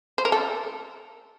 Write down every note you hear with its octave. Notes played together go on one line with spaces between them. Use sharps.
C5
A#4
A4